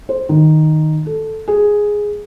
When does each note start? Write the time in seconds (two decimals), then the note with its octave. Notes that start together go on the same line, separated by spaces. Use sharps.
0.09 C5
0.29 D#3
1.06 A4
1.48 G#4